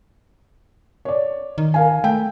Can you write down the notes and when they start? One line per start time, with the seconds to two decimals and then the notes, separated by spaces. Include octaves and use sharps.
1.05 C#5 D5
1.58 D#3
1.74 A#4 F5 G#5
2.04 A3 G5